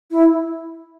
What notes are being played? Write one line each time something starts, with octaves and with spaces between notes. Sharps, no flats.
E4